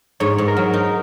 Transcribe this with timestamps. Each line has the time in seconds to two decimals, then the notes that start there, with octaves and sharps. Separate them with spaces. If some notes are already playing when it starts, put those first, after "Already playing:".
0.20 G#2 C#5
0.38 G#2
0.48 A#4
0.57 F#3
0.73 D#4 A#4